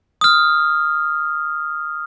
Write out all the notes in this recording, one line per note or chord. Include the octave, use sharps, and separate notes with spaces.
D#6 F6